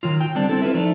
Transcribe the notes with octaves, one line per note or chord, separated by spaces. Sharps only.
D#3 F#3 F4
G5
D3 G3 C4 D4
C4 E4 A4
F4 A4 B4 E5
F3 A3 D4 D#4